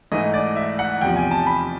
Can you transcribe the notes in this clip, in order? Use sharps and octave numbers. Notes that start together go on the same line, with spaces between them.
G#2 E3 A3 D#5
D5
E5
F#5
E2 C3 F3 G5
G#5
A5
B5